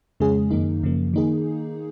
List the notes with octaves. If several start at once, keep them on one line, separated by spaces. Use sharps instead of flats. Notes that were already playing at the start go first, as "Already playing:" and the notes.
F2 C#3 G#3 C#4 G#4
F#2 D#3 A#3 D#4
F#2 C#3 F3 A#3
D#3 A#3 D#4 G#4